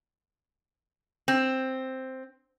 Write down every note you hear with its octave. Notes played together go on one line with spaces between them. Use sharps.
C4